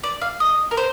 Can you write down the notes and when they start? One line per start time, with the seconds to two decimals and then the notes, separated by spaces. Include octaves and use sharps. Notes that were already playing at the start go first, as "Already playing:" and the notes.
0.03 D5
0.22 F5
0.40 D#5
0.71 A#4
0.77 C5